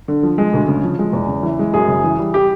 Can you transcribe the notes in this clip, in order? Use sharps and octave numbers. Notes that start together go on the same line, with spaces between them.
D3
F3
G#3
D2
C#3
F3
G#3
E2
C#3
E3
G#3
F#2 G#4
C#3
E3
G3
G4